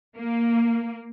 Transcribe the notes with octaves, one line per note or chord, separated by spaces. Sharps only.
A#3